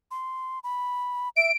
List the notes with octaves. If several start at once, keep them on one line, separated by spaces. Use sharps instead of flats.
C6
B5
E5 D7